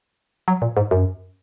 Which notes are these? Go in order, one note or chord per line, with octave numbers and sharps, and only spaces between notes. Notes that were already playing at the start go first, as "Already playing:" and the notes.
F#3
A#2
G#2
F#2